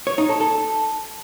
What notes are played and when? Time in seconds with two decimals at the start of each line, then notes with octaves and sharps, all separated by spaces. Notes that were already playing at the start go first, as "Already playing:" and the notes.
0.07 C#5
0.18 D#4
0.29 A4
0.41 A4